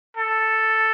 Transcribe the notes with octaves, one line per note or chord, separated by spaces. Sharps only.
A4